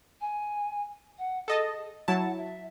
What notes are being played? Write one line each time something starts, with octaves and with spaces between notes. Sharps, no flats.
G#5
F#5
G#4 A4 D#5 A5
F#3 E4 F#5 A5
E5